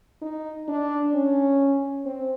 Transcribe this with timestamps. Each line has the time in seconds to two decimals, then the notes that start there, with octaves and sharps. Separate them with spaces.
0.22 D#4
0.68 D4
1.14 C#4
2.06 C4